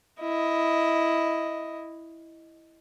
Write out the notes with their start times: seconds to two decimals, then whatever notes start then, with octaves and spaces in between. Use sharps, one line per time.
0.20 E4 D#5